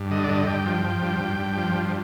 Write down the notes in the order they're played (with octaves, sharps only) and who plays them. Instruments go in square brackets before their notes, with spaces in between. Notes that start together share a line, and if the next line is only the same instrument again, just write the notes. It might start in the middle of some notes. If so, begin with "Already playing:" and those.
Already playing: [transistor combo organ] G2
D3 D#5
D5
G2 D#5
G2 G5
F3
F3
G2
G2
G2
F3
G2